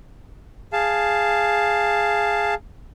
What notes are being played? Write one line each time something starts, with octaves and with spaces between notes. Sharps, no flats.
G#4 F5 A5